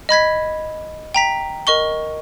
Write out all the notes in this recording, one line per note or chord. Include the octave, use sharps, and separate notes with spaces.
D#5 B5 G#6 B6
G5 A#5 B6
A#4 D#5 C#6 G7